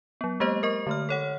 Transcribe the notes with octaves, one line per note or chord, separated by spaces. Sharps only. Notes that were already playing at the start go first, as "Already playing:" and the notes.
F#3 B3
G#3 A#3 G4 C5 D#5
A#4 D#5 C#6
D3 A3 F6
A4 C#5 F#5